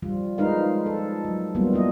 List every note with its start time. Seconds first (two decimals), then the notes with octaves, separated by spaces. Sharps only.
0.02 F3 G3 F4
0.38 F3 G#3 D#4 A#4 B4 F5
0.86 A4
1.25 F#3
1.55 F#3 G3 A#3 B3 F4
1.73 F#3 E4 D#5